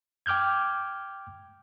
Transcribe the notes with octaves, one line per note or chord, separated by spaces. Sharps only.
G5 D6 F6 G6 G#6